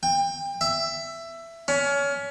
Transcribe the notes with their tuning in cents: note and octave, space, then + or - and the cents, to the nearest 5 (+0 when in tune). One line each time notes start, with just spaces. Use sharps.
G5 +30
E5 +15
C#4 +25